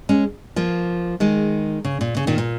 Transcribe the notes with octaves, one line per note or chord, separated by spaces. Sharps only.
G#3 C#4
F3 A#3
D#3 G#3
C#3
A#2
C#3
A#2 D#3
A#2